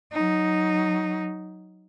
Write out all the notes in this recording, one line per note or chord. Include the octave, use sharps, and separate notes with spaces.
F#3 D#4